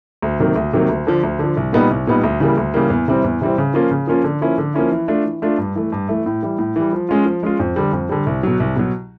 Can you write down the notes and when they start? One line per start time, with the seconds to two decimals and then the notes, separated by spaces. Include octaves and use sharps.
0.22 D2
0.40 C3 D#3 F#3 A#3
0.56 D2
0.73 C3 D#3 F#3 A#3
0.89 D2
1.07 D3 F3
1.23 D2
1.39 D3 F3
1.57 C2
1.73 A#2 G3 B3 D#4
1.90 C2
2.07 A#2 G3 B3 D#4
2.23 D2
2.40 C#3 E3 G3 A#3
2.57 D2
2.74 C#3 E3 G3 A#3
2.90 E2
3.08 C3 E3 G3 C4
3.24 E2
3.41 C3 E3 G3 C4
3.58 C#3
3.74 F3 A#3 C#4 F4
3.91 C#3
4.07 F3 A#3 C#4 F4
4.24 D3
4.41 F3 A#3 C#4 E4
4.58 D3
4.74 F3 A#3 C#4 E4
4.92 E3
5.08 A3 D4 F4
5.24 E3
5.42 A3 D4 F4
5.58 G2
5.75 E3 A3
5.92 G2
6.09 E3 A3
6.26 A2
6.43 E3 G3
6.59 A2
6.76 E3 G3
6.93 F3
7.09 G#3 C#4 F4
7.25 F3
7.43 G#3 C#4 F4
7.60 F2
7.76 D3 G3
7.93 F2
8.09 D3 G3
8.26 C2
8.43 B2 F#3
8.60 C2
8.76 B2 F#3